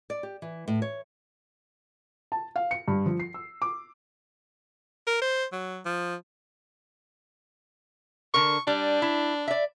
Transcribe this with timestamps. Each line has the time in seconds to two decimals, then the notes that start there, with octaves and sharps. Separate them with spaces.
0.10 D5
0.23 G4
0.42 E3
0.68 A2
0.82 C#5
2.32 A5
2.56 F5
2.71 C#7
2.88 G2
3.06 F3
3.20 C7
3.34 E6
3.62 D6
5.07 A#4
5.21 C5
5.52 F#3
5.85 F3
8.34 D3 A#4 C#6
8.67 G3 D4
9.02 E4
9.48 D5 E5